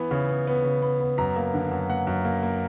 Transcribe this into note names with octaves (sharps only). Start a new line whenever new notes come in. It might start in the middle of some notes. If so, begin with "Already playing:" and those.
Already playing: E3 B3 B5
C#3
B3
B3
C#3
B3
B3
F#2 A#5
A#3
D3
F#2
A#3 F#5
F#2
A#3
A#3